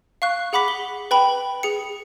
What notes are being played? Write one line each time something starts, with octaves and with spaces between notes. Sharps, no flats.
F5 C#6 F#6
G#4 F#5 B5 D6 B6
G7
B4 G5 B5
G#4 C#7